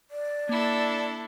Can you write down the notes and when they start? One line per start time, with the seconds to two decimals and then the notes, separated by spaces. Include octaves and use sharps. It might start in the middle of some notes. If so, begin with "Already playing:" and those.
0.11 D5
0.49 A#3 D4 E4 A4